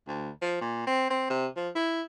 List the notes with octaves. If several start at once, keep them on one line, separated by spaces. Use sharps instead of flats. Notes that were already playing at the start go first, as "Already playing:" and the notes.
D2
F3
A#2
C4
C4
C3
F3
E4